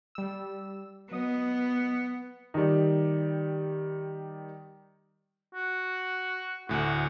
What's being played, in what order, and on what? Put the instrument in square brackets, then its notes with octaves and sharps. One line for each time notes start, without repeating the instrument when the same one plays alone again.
[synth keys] G3 E6
[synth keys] F#3 D#5 D#6 [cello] B3
[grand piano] D#3 G3
[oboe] F#4
[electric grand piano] D2 A2 [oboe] F#4